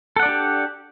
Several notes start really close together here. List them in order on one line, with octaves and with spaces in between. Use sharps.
A4 F#5 D5 D4 G4